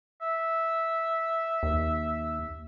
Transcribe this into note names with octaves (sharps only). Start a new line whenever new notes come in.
E5
D#2